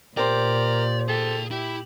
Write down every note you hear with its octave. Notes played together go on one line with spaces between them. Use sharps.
A#2 G4 A#4 C5 D5
G#4 A4 G5
E4 G4